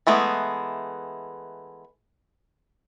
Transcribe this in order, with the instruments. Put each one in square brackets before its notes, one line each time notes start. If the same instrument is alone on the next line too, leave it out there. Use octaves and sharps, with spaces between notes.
[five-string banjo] E3 G#3 A3 B3